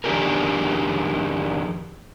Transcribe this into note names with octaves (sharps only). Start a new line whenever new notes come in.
F2 D#3 D4 G4 G#4 A#4